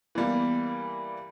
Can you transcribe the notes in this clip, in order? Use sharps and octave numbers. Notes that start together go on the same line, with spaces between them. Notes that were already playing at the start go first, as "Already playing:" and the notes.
E3 G3 A#3 B3